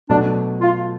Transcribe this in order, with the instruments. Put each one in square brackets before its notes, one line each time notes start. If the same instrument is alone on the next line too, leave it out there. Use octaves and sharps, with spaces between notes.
[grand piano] B2 F#3 A3 [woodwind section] D4
[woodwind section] F4